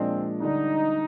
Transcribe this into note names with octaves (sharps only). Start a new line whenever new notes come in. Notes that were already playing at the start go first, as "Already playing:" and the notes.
Already playing: A#2 F3 G#3 C4 D4
D3 G3 D4 D#4